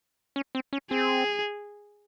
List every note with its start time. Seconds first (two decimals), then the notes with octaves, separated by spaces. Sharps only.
0.36 C#4
0.55 C4
0.73 C#4
0.91 C4 G#4